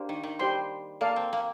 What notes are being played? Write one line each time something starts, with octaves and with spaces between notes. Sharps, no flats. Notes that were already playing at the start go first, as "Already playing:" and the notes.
Already playing: A#3 D4 G4 C5
D#3
D#3
G3 G4 C5 G5 C6
A#3 A4 D5 F5
C4
A#3